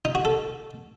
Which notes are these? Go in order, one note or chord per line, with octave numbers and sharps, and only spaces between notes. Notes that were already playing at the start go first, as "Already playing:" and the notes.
D#4
F#4
A4